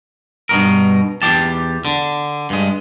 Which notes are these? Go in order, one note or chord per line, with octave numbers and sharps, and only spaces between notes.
G2 B2 A#4
E2 F#3 G4 A5
D3
G2 G#3